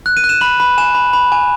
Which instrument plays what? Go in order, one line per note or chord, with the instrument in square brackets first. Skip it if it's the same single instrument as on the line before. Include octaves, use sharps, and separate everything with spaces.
[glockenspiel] F#6
D#7
F#6
E7
B5 F#7
B5
G#5 E7
B5
B5
G#5